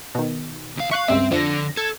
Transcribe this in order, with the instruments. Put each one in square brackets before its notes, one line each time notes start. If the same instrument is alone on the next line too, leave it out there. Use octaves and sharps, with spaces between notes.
[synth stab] B2 D#3
[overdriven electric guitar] D2 F5
[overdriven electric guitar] E5 F5 [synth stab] C#6 F#6
[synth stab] C#2 G2 E5 [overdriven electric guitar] C4
[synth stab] F2 A#6 [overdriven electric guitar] D3 D4
[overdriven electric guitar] A4 [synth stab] G#6